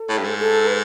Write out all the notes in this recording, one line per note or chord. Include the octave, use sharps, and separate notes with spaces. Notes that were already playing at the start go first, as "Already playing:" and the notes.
Already playing: A4
A2
G2
G#2
A4
B4